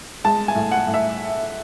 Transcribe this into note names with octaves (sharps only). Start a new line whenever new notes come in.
G#3 A5
G#5
A2
F#5
A2
E5